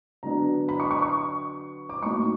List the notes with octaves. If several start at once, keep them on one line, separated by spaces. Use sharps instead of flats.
D3 F#3 B3 D4 A#5
B5
C#6
C#6
C#6
D6
A2 F#3 A#3 D#4 C#6